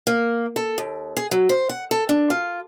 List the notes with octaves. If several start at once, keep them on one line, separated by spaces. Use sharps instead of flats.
A#3
A4
D#2
G#4
F#3
C5
F#5
A4
D4
F4